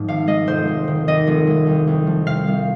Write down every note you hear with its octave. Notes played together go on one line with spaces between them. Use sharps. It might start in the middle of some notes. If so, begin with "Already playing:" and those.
Already playing: G#2 F3 G#3
G#1 F5
G#3 D#5
F1 C5
G#3
D#3
D#2 D#5
F1
G#3
C2
C2
F3
C3 F5
C2